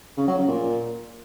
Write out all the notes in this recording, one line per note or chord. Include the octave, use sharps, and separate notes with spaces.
C#3
F#3
C#3
A#2